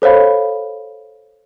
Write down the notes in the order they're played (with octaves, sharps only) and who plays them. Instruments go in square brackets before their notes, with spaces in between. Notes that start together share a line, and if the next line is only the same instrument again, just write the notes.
[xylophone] A4 C5 C#5 F5 B5